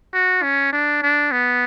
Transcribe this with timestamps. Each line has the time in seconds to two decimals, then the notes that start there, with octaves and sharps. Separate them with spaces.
0.14 F#4
0.43 C#4
0.72 D4
1.02 D4
1.32 B3